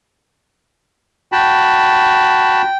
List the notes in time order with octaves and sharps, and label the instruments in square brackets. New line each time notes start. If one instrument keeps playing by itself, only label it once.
[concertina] F#4 A5 B5 [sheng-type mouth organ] G5